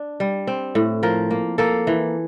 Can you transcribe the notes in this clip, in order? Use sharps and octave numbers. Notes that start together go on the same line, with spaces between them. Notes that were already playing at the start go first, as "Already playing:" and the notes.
Already playing: D4
G3
C4
A2
F3 A#4
A#3
A#3 A4
E3